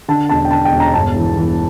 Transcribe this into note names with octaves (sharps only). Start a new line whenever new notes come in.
D3 A5
E1 A5
G5
D3 A5
G5
E1
A#5
G1 A5
E3
E3